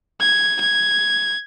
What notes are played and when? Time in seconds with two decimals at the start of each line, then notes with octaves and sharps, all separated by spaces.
0.20 G#6
0.60 G#6